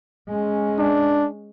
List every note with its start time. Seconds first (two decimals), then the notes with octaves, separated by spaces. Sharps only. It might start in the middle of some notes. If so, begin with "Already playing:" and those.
0.29 G#3 C#4
0.79 D4